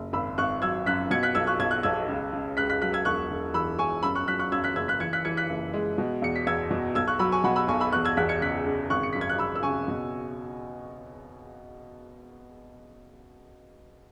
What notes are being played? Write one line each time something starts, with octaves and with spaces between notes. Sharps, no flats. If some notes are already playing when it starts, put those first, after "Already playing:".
Already playing: F#1
G#1 B5 E6
G#1 C#6 F#6
F#3 E6 G#6
F#2 F#6 B6
B2 G#6 C#7
F#6 B6
B1 E6 G#6
C#6 F#6
B1 G#6
F#6
B1 E6 G#6
C#2
C#3
C#2 F#6 B6
F#6 B6
F#3 F#6 B6
E6 G#6
E1 C#6 F#6
E1
E3 B5 E6
E1 G#5 C#6
F#2 B5 E6
C#6 F#6
F#3 F#6 B6
C#6 F#6
F#2 E6 G#6
F#6 B6
F#1 E6 G#6
F#6 B6
E3 G#6 C#7
F#6 B6
E3 G#6 C#7
F#6 B6
F#1
G#3
B2
E2 C#7
B6
E2 E6 G#6
B2
B1 E6 G#6
C#6 F#6
F#3 B5 E6
G#5 C#6
B2 F#5 B5
B5 E6
B1 G#5 C#6
B5 E6
E2 C#6 F#6
E6 G#6
E2 F#6 B6
G#6 C#7
C#3 F#6 B6
C#3
G#1 C#6 F#6
C#7
F#2 B6
G#6
F#6
C#3 B5 E6
E6
C#3 G#5 C#6
B2